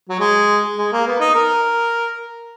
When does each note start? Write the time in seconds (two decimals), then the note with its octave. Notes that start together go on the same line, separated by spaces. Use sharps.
0.09 F#3
0.19 G#3
0.78 G#3
0.92 A#3
1.07 B3
1.20 D#4
1.34 A#4